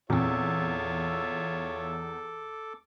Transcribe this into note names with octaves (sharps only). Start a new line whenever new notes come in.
E2 A#2 C4 F4 A4 C#5 E5 D6